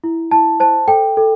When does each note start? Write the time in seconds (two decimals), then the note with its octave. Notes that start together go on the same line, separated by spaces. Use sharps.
0.04 E4
0.31 E4 A5
0.60 C5 A5
0.88 A4 G5
1.17 A4